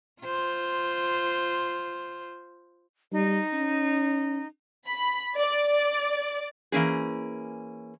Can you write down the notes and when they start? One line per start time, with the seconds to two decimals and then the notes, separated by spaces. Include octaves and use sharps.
0.22 F4 C5
3.12 G3 D#4
3.53 C#4
4.87 B5
5.37 D5
6.72 E3 A#3 C#4 G#4